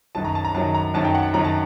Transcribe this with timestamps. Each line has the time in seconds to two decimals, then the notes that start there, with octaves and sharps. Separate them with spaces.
0.15 F#2 D#3 F#3 A5
0.25 A#5
0.35 A5
0.45 A#5
0.54 F#2 D#3 F#3 A5
0.75 A#5
0.94 F#2 D#3 F#3 A5
1.05 G5
1.15 F#5
1.34 F#2 D#3 F#3 A#5
1.44 A5